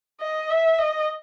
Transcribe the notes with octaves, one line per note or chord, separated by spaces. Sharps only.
D#5
E5
D#5